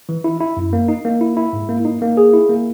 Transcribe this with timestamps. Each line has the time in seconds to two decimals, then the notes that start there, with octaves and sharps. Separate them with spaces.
0.09 E3
0.24 E4
0.41 E4
0.57 F#2
0.73 A#3
0.88 D#4
1.05 A#3
1.21 E4
1.37 E4
1.53 G#2
1.69 A#3
1.85 D#4
2.02 A#3
2.17 G#4
2.33 E4
2.49 A#3